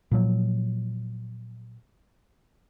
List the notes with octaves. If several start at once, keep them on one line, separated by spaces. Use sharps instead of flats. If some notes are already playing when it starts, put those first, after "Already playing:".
A#2 F3 F#3